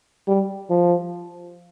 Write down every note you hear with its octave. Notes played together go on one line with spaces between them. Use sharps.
G3
F3